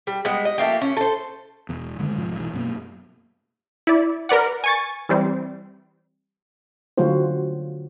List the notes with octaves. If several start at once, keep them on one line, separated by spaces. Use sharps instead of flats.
G3
G3 G#3 B3
D#5
F3 A3 A#3 G4
C#4
A4 C5
E1 E2
F#1 D3 D#3 G#3
F#1 B1 G#2 F3
B1 E3
F#2 B2 A#3
E4 D5
A#4 B4 D5 F#5
G#5 C#6 A6
E3 G3 C4
D3 F#3 A3 F4 F#4 C5